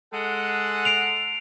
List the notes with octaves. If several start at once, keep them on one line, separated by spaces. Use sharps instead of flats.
G#3 A4 F#5
C7 D7 F7